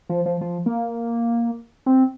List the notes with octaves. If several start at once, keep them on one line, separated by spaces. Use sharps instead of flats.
F3
F3
F3
A#3
C4